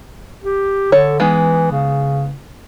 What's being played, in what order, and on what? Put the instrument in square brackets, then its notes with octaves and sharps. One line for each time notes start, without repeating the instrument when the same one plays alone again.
[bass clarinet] G4
[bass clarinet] D3 [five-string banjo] A4 C#5
[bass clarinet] E3 [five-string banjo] G#3 B3 D#4
[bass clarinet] C#3